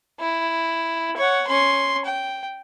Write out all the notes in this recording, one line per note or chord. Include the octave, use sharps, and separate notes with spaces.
E4
C#5 F#5
C#4 C6
G5